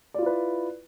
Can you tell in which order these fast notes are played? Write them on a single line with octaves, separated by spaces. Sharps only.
D5 F4 E4 B4